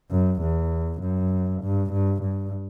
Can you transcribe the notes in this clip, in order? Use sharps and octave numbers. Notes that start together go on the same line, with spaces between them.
F#2
E2
F#2
G2
G2
G2